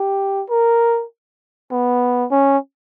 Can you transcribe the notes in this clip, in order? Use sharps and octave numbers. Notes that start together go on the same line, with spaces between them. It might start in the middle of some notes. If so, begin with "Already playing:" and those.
Already playing: G4
A#4
B3
C#4